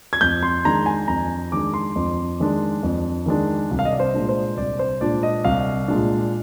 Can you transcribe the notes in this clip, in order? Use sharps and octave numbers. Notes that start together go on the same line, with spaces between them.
G#6
F2 G6
C6
D#3 G#3 D4 A#5
G#5
F2 A#5
D#3 G#3 D4 D6
C6
F2
D#3 G#3 D4
F2
D#3 G#3 D4
C2
F5
D#5
D5
C5
A#2 G#3 D4
C5
C2 D5
C5
A#2 G#3 D4 D5
D#5
C2 F5
A#2 G#3 D4